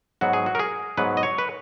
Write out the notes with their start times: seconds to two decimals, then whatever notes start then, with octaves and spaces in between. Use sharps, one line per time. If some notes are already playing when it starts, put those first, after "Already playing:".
0.21 G#2 F#3 B3 F#4
0.33 G#4
0.46 F#4
0.55 A#4
0.59 G#4
0.97 G#2 F#3 B3 B4
1.17 D#5
1.23 C#5
1.38 B4